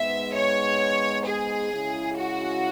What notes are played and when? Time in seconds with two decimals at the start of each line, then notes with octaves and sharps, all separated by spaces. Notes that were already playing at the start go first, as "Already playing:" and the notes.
Already playing: G#2 G#3 B3 E5
0.34 C#5
1.25 G#4
1.72 C#3 G#3 C#4 E4
2.18 F#4